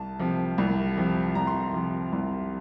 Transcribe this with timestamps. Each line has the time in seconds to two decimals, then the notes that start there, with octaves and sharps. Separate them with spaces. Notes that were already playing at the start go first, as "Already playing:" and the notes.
Already playing: C2 A5
0.19 C3 F3
0.58 C2
0.97 C3 F3
1.35 C2 A#5
1.47 C6
1.61 A#5
1.73 C3 F3
2.12 C2